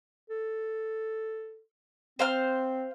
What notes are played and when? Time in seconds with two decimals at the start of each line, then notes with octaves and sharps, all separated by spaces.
0.30 A4
2.19 C4 C5 F5 F6